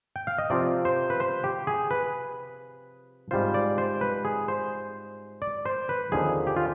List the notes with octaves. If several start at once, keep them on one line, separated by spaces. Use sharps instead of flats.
G5
F5
D#5
C3 F3 C4 F4 D5
C5
B4
C5
G4
G#4
B4
G#2 G3 C4 F4 C5
D5
C5
B4
G#4
C5
D5
C5
B4
D#2 D3 F3 C4 D#4 G#4
G4
F4